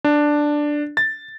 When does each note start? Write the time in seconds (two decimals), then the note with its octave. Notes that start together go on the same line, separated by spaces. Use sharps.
0.04 D4
0.97 A6